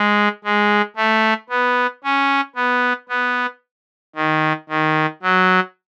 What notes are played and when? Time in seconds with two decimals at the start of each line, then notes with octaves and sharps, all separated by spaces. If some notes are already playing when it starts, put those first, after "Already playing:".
Already playing: G#3
0.44 G#3
0.96 A3
1.49 B3
2.04 C#4
2.56 B3
3.09 B3
4.16 D#3
4.69 D#3
5.23 F#3